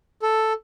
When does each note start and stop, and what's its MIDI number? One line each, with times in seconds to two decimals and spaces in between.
0.22 0.53 69